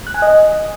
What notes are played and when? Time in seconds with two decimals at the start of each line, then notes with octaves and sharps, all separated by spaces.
0.07 F#6
0.14 G#5
0.22 D#5